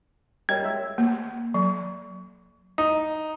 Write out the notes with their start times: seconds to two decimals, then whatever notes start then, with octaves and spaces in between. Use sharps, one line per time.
0.49 G3 A#4 C#5 D#5 G5 G#6
0.62 G#3 E5 E6
0.98 A#3
1.54 F#3
2.78 D#4